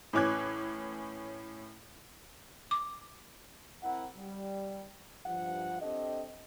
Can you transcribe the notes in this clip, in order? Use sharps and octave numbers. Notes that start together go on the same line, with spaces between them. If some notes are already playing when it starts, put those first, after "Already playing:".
A2 E3 C#4 D6 F#6 G#6
D6
C4 E4 A#4 F#5
G3
G2 F3 F#5
C4 D4 G4 A4 D#5